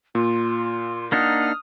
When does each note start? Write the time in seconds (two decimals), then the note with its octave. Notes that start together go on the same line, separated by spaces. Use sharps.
0.15 A#2 F4
1.12 A#3 D4 D#4 F#5 D#6 F6